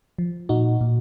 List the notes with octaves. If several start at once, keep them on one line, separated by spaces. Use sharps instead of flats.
F3
A#2 D#4 F#4
A#2